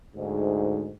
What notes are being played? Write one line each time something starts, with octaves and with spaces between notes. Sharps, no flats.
D2 G#2